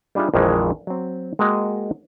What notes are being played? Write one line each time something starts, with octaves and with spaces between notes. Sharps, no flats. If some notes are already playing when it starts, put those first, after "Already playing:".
G3 D4 D#4 F4 G#4 E5
A#1 F2 D#3 E3 G#3
F#3 C4
G#3 A#3 F#4 D#5 G5